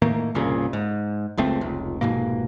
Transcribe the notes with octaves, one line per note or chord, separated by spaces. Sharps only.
A2 D#3 A3 A#3
G1 C2 A#2 C#3
G#2
F#1 C#2 A3 C4
F1 C#2
F1 G#2 B2 A#3